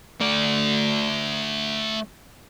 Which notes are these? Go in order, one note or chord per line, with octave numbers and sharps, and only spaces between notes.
A3 D5